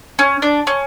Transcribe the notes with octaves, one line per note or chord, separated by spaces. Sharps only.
C#4
D4
C#4